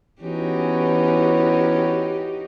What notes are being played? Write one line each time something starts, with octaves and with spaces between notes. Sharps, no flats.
E3 B3 C#4 D#4 F#4 G4